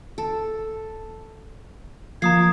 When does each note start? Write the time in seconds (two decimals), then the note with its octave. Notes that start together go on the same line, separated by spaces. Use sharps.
0.18 A4
2.22 F3 A#3 A#5 D#6 G#6 C7